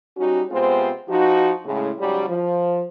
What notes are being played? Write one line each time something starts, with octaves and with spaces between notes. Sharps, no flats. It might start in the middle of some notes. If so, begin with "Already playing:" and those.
G3 C#4 D#4 F#4
C3 G#3 B3 C4 F4 C5
F3 D#4 F#4
A2 C#3 G#3
G#2 C#3 F#3 G3
F3